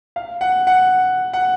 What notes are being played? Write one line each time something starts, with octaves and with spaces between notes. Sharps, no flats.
F5
F#5
F#5
F#5